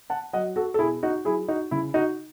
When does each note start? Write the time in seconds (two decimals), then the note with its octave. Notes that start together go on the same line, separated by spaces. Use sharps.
0.10 F#5 A5
0.33 F#3 D#5 F#5
0.56 F#4 A4
0.74 A4
0.79 B2 E4 G#4
1.03 D#4 F#4
1.25 F#3 E4 G#4
1.48 D#4 F#4
1.71 C#3 E4
1.94 D#4 F#4